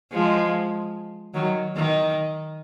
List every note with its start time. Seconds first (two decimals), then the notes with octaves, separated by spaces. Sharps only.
0.12 F3 G#3
1.34 D#3 F#3
1.76 D#3